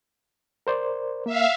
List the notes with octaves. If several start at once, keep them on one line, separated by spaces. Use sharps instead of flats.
A#4 C5 D5
A#3 E5 F5